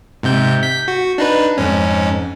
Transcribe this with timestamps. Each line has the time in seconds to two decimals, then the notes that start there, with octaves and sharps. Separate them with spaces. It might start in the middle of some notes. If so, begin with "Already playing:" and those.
0.23 G#2 C3 G6
0.63 G6 B6
0.88 F#4
1.18 D4 D#4 B4
1.58 F2 G#2 C#4